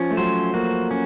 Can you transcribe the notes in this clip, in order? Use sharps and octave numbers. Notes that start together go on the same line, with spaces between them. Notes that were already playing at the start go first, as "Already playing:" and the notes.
Already playing: F3 C#4
A3
F#3 C5
A#3 F#4
C#4